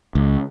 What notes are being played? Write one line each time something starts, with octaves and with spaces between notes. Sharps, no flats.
C#2